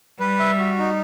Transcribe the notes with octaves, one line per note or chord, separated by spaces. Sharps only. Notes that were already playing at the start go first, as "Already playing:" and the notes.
G3 B4
E5
F#4
D#4